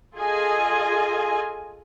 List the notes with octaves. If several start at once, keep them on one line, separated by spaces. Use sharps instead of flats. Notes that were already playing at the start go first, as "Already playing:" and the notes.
F4 G#4 A4 D#5 G#5